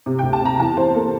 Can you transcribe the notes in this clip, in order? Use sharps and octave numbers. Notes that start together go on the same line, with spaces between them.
C3
D2 G5
A5
C3 A#5
E2 A5
E2 C5
A#3 A4